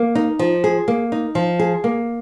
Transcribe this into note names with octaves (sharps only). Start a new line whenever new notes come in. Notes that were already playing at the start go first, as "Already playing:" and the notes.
Already playing: A#3
D#4
F3
G#4
A#3
D#4
F3
G#4
A#3